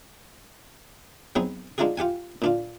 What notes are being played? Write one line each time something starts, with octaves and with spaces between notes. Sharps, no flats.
F#3 B3 C4 D#4 G#4
G#3 D4 D#4 F4 F#4 G#4
F4 G4 F#5 G#5
A#2 D4 F4